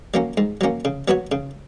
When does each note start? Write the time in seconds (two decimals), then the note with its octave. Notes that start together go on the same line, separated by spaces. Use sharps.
0.14 F#3 A#3 C#4
0.37 G#2
0.61 F#3 A#3 C#4
0.85 C#3
1.08 F#3 B3 F#4 C#5
1.32 C#3